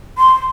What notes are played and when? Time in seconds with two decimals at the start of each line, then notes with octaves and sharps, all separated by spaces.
0.18 C6